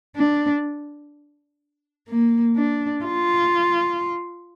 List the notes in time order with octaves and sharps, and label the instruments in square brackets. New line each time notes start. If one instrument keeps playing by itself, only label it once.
[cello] D4
A#3
D4
F4